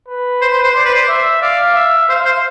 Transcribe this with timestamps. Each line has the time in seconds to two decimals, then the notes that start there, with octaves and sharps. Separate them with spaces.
0.08 B4
0.41 C5
0.53 C5
0.64 C5
0.75 C5 D5
0.85 B4
0.95 C5
1.08 E5
1.41 D5 F5
1.75 E5
2.09 C5 F5
2.25 C5